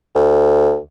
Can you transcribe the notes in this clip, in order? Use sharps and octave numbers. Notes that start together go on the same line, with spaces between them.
D2